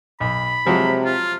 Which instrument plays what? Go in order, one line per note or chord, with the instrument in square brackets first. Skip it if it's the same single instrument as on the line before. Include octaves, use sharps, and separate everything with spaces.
[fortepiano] B1 [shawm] B5
[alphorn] C3 [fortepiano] F3 F#3 G#3
[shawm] F4